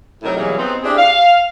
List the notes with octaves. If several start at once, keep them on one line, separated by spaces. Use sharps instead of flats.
A2 C3 F#3 D#4 E4 A#4
B2 E3 F#3 G3 A#3 G#4
B3 C4 D#4
C4 D4 E4 G4 G#4
F5